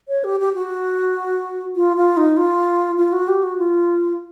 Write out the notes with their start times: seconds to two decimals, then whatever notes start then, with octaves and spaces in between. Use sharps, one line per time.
0.08 C#5
0.24 G4
0.40 G4
0.54 F#4
1.76 F4
1.97 F4
2.17 D#4
2.37 F4
2.98 F4
3.13 F#4
3.28 G4
3.43 F#4
3.58 F4